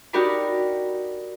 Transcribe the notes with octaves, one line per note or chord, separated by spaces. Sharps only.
D#4 F#4 G4 A#4 D5 B5